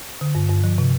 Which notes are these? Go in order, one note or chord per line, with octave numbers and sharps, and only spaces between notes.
D3
G2
G2
F3
C3